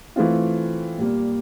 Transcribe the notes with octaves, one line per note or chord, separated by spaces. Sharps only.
E3 A3 C4 F4
A#2 G3 A#3